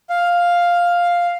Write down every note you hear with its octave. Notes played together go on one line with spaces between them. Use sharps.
F5